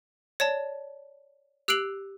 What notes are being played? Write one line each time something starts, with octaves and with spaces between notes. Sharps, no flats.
C#5 D5 A5
G4 E6 F#6 C7 D7 F#7